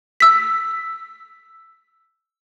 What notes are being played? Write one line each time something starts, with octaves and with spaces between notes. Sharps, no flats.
E6 B6